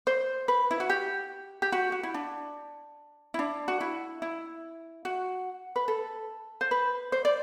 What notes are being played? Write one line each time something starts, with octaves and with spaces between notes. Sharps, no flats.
C5
B4
E4
F#4
G4
G4
F#4
F#4
E4
D4
E4
D4
F#4
E4
E4
F#4
B4
A4
C5
B4
C5
D5